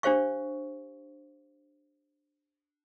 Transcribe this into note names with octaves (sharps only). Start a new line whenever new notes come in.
D4 G4 C5 F5 C#6